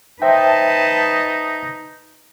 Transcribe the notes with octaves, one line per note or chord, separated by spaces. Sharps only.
D#4 B4 C5 D#5 E5 G5 A5